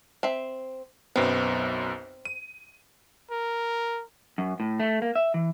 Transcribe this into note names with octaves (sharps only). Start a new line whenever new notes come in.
C4 E5
B1 F#2 B3 C4
D#7
A#4
F#2
A2
A3
A#3
E5
E3